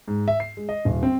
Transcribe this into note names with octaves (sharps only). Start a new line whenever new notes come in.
G#2
E5
C7
G#3
D#5
D#1
C4